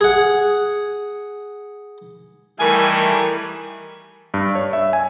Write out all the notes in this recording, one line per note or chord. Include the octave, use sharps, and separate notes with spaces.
G#4 F#5
D#3 E3 G3 A3 A#4 G#5
G2
C#5
E5
G#5